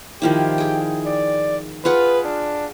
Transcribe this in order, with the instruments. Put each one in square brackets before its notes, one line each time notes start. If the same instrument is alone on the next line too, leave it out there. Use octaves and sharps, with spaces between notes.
[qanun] D#3 F3 E4 [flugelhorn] G4
[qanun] G#4 G5
[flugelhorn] D5
[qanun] F4 G#4 F#5 [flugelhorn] B4
[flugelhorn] D4